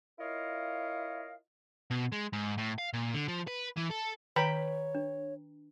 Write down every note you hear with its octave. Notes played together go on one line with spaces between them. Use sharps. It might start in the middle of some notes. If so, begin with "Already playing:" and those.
E4 F4 A#4 C#5 D#5 F5
B2
G#3
G#2
A2
F5
A#2
D3
F3
B4
E3
A4
D#3 B4 C#5 G5 A#5 B5
D4